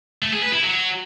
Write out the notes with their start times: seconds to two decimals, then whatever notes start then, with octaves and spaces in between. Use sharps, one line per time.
0.22 A3
0.33 G#4
0.43 B4
0.53 E4
0.63 F#3